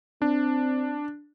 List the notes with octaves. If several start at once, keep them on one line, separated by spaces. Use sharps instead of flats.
C4 D4